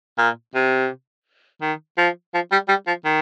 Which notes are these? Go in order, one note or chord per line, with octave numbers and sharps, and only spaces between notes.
A#2
C3
D#3
F3
F3
G3
G3
F3
D#3